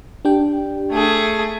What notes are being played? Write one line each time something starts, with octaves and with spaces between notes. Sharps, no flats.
D4 G4 G5
A3 G#4